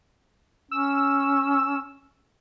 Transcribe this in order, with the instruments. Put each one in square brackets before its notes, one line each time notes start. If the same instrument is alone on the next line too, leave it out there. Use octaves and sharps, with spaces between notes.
[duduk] C#4 [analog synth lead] E6